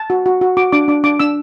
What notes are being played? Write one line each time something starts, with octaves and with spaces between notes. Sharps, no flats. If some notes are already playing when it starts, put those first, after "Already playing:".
Already playing: A5
F#4
F#4
F#4
F#4 D6
D4 D6
D4 D6
D4 D6
D4 E6